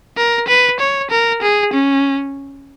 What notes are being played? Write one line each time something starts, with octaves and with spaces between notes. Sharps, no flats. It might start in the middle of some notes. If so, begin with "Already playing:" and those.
A#4
B4
C#5
A#4
G#4
C#4